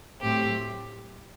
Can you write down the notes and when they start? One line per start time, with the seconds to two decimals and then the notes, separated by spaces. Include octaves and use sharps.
0.21 A2 F#3 A3 C4 G4